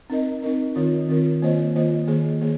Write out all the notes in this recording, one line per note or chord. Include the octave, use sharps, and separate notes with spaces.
C4 D#4 A#4 D#5
C4 D#4 A#4 D#5
D#3 C4 F4 A#4
D#3 C4 F4 A#4
D#3 A#3 F4 C5 D#5
D#3 A#3 F4 C5 D#5
D#3 A#3 G#4 C5
D#3 A#3 G#4